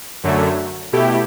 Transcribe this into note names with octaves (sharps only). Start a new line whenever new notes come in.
F#2 D3 F#3 A3
B2 A3 E4 G4